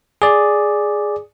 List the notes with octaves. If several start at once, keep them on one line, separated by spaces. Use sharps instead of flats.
G#4 D5